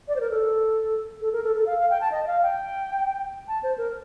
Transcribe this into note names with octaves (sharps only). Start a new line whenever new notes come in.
D5
C5
A#4
A4
A4
A#4
A4
A4
F5
F5
G5
A5
D#5
D#5
F5
G5
A5
C5
A#4